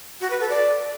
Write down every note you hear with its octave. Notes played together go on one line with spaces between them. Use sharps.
F#4
B4
A4
D5